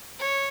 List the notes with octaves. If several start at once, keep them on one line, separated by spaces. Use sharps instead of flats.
C#5